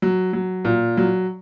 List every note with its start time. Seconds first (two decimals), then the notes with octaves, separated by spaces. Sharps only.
0.02 F#3
0.33 F#3
0.65 A#2
0.97 F#3